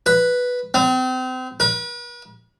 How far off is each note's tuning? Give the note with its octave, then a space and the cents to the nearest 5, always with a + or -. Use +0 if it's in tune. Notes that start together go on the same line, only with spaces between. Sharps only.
B4 -5
C4 -35
B4 -45